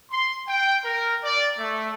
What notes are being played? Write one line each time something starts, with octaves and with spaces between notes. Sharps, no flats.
C6
G5
A#4
D5
A3